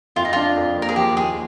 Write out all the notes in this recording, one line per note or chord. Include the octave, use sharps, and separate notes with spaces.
F2 F4
D#4
D4 F4
F2
A#3
A#4
G#4
F3 G4
D#2 G#4